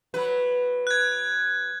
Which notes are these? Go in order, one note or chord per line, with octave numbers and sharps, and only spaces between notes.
F#3 B4
F#6 G#6